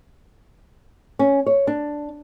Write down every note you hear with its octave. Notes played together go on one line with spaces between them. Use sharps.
C#4
C#5
D4